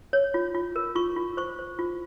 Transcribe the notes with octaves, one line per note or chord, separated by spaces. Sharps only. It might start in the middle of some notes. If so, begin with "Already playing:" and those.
C#5
F4
F4
A#4
F4 C#6
F4
C5 C#6
C5
F4